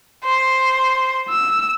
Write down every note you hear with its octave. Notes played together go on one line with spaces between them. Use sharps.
C5
E6